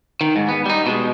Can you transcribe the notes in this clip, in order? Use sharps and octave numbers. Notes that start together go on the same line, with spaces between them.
D#3
G#2
B3
G3 D#4
B2 G#3